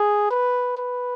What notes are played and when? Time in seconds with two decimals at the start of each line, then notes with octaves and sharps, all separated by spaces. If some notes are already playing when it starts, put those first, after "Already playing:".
Already playing: G#4
0.30 B4
0.77 B4